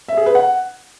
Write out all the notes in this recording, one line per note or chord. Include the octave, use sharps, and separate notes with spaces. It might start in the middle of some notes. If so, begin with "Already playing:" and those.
E5
G#4
B4
F#5